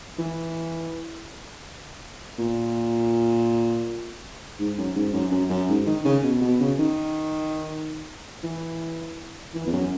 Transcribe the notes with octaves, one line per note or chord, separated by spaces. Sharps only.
E3
A#2
G#2
F#2
G#2
F#2
F#2
F#2
G#2
D#3
C#3
B2
B2
C#3
D#3
E3
E3
E2
F#2